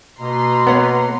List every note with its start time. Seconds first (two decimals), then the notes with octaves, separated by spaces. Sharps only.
0.20 B2 A#3 B4 A#5 C6
0.67 B3 C#5 F#5